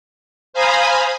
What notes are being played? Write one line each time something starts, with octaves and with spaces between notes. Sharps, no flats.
C5 F5 G#5 A#5 B5 D#6